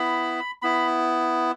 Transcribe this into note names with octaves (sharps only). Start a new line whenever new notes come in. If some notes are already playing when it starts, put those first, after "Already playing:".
Already playing: B3 E4 B5
B3 E4 B5